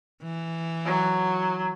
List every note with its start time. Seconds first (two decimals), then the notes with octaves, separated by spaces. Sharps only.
0.23 E3
0.85 F#3